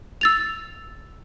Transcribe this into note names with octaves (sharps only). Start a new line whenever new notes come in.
E6 A6 F7